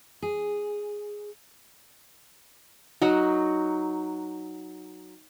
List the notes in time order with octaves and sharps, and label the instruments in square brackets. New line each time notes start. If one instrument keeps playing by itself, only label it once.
[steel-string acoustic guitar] G#4
[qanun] F#3 D#4 F#4